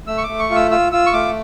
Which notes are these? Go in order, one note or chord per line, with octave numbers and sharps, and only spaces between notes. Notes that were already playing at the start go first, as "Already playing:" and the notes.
A3 E6
C#6
D6
A3
C#6
F4
E6
F4 E6
F4 E6
C#6
A3 D6